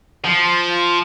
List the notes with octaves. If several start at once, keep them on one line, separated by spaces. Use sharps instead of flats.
F3